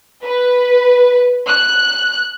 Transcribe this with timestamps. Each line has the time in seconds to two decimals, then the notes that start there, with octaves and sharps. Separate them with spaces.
0.23 B4
1.48 F#6